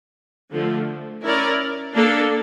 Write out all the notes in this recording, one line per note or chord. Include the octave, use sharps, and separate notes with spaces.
D3 F3 A3
C#4 E4 A#4 D5
A#3 D4 A4